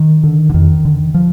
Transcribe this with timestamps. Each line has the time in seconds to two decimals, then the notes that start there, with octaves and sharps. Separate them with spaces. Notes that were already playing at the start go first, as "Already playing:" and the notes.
Already playing: D#3
0.23 D3
0.50 D3
0.54 F2 D#3
0.85 D3
1.14 F3